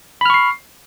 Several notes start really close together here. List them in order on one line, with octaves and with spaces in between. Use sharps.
B5 F6 C#6 C7